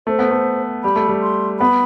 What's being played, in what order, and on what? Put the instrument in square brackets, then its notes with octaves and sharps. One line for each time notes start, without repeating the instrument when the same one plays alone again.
[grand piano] A3 [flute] C5
[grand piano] B3
A3
[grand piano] G3 [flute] B5
[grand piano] A3
G3
[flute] C6
[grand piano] B3 [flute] B5